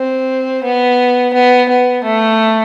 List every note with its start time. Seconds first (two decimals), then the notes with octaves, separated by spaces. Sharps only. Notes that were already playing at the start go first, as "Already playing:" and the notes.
Already playing: C4
0.63 B3
1.33 B3
1.69 B3
2.04 A3